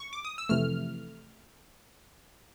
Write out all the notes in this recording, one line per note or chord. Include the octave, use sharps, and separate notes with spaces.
C#6
D6
D#6
E6
F2 C3 E3 A3 F6